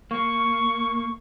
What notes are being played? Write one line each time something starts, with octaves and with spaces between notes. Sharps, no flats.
A#3 C#6